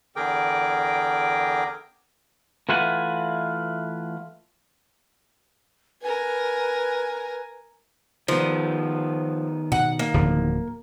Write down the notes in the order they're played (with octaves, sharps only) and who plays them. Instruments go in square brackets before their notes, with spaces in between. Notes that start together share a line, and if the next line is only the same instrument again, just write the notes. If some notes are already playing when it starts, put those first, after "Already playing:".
[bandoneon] E2 D3 G#4 A#4 G5 D6
[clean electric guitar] E3 A3 F4 B4 F#5 G#5
[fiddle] A#4 G#5 [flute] B4
[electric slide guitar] D#3 B3 [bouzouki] F3
[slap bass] B2 [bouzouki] F#5
[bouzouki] A#3
[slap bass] D1 D3 F3